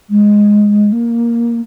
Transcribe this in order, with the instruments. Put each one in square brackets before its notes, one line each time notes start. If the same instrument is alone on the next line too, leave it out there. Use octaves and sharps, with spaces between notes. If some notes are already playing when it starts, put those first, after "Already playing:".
[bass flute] G#3
A#3